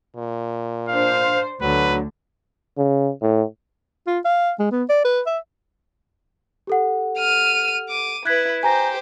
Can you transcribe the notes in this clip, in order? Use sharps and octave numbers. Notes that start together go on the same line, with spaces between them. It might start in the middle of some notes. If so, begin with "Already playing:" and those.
A#2
D4 C5 F5
D2 D3 F#3 B4
C#3
A2
F4
F5
G#3
B3
D5
B4
E5
G4 A4 F#5
F6 D#7
D6 D#7
E4 B4 F#6 G#6 B6
G4 C5 G#5 A#5 A#6